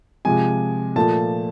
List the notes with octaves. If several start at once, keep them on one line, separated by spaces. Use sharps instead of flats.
C3 F3 G#3 G#5
A#2 F3 A3 A5